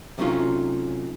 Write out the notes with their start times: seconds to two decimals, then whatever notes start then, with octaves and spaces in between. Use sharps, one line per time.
0.18 C3 F#3 A3 C#4 D#4 F4